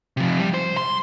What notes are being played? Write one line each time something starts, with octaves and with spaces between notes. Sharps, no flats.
C3 F3
G3
C5
C6